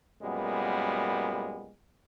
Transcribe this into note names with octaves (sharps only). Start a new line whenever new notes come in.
F#2 A#2 G3 G#3 B3